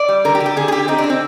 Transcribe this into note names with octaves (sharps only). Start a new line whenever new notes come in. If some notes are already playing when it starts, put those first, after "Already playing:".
Already playing: D5
G3
D3 A#4
G4
D3
G4
D3 G#4
G#4
D3 G4
C4 D#4
D4
D3
C4